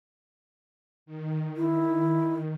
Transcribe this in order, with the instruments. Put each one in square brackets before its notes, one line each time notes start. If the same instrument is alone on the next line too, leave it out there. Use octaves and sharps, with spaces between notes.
[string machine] D#3
[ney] E4